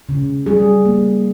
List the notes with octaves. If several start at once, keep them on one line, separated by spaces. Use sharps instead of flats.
C#3
G3 G#4
A#3